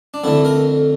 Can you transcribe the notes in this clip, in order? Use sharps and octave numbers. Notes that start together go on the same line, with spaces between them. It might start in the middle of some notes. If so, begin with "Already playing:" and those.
D4
F2 D3 A3 E4
A#4